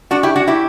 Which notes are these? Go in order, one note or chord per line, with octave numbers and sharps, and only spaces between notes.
D4 F#4
E4 G4
D4 F#4
E4 G4